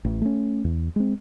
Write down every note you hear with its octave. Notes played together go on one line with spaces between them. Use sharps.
A1
A3 C#4
E2
G#3 C4